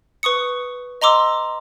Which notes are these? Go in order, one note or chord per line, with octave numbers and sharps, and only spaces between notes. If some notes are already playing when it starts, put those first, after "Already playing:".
B4 C#6 D#6 C#7
D#5 A#5 C6 D6 E6